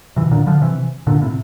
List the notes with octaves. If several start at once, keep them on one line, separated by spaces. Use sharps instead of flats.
C3 E3
A#2 D3
D3 F3
C3 E3
A#2 D3
A2 C3